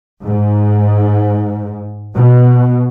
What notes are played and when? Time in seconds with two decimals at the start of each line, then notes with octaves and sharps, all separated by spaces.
0.24 G#2
2.17 B2